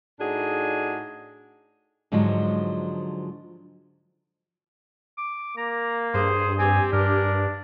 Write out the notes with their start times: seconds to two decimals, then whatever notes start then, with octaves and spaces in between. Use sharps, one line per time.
0.19 A2 D4 D#4 F#4 G#4
2.12 G#2 D3 F3 F#3 G#3
5.18 D6
5.58 A#3 A#5
6.14 G2 G#4 C5
6.59 C4 G4 G#5
6.93 G2 D4 A#4